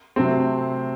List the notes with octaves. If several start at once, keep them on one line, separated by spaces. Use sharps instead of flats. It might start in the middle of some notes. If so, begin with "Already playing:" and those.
C3 F#3 A3 C4